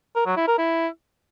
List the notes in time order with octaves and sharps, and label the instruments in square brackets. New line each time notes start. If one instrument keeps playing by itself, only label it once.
[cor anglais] A#4
F#3
E4
A#4
E4